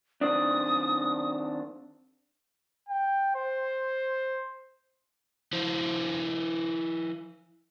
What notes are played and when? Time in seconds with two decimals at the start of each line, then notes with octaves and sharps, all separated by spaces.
0.21 D#3 C4 D4 D#6
2.89 G5
3.35 C5
5.53 F3 E4 C5